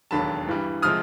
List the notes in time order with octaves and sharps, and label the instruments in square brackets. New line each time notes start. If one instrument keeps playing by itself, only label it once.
[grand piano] E1 D#2 D3 F#3 A5 B5
G2 E3 G3
C3 F3 G#3 D#6 F6